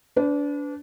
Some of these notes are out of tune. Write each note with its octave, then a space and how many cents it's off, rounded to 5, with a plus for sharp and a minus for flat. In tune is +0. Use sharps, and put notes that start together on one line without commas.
D4 -25 B4 +30